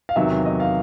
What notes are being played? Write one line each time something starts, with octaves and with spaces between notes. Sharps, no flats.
F5
E2 C3 D#3 F#3 E5
D#5
F5